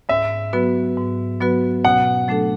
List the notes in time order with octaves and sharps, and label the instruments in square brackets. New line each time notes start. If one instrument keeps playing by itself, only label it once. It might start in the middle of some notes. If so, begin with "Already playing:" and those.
[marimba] G#2 [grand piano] E5
[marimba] F#3 B3 F#4 B4
G#2
F#3 B3 F#4 B4
[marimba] B2 [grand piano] F#5
[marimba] F#3 A3 D4 A4